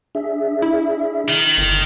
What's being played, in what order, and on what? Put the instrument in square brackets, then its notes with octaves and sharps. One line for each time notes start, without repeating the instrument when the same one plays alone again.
[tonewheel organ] D4 G#4 E5
[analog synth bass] E4
[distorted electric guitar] D#3
[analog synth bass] G1 [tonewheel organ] D3